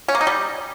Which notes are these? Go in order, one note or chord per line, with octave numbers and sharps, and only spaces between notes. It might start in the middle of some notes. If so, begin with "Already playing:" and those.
C#4
A#3
D#4
G3